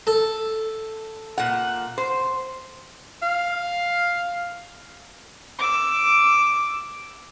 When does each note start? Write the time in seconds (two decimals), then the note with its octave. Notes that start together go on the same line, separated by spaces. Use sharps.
0.07 A4
1.38 A#2 F#5
1.98 C5
3.22 F5
5.58 D6 E6